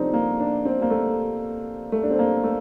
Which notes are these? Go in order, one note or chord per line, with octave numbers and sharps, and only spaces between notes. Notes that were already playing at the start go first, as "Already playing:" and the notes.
Already playing: C3 F3 A3 C4 D4 D#4
A#3
D4
C4
A#3
A3
A3
D4
C4
A#3
A3